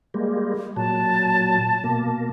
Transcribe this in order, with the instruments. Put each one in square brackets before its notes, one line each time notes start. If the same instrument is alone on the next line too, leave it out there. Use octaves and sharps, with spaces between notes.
[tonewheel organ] G3 G#3 A#3
[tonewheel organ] A#2 F#3 [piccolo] A5
[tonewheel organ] B2 A#3